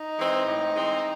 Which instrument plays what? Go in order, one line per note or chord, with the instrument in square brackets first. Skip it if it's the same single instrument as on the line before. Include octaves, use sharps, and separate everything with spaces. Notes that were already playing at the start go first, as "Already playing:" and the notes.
Already playing: [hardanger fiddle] D#4
[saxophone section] E3 G#3 C4
A2
E3 G#3 C4